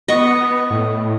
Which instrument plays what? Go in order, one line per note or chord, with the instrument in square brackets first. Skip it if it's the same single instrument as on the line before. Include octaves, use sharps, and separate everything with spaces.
[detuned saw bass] B3 [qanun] D#5 C#6
[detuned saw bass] A2